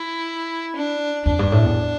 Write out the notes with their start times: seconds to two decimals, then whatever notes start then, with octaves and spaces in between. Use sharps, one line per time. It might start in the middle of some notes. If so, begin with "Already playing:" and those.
Already playing: E4
0.76 D4
1.26 F2 D4
1.39 G2
1.52 A2
1.64 E2